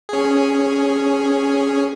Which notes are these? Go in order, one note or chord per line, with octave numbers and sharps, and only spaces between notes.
C#4 G#4